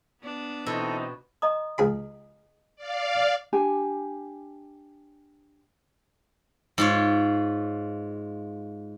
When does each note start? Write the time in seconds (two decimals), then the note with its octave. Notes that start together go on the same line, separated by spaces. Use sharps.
0.22 B3 D4
0.66 B2 E3 C4 D#4 A4
1.42 D#5 A#5 D#6
1.78 C#2 G#4 B5
2.76 D5 F5
3.53 D4 G4 G#5
6.78 G#2 F4 C#5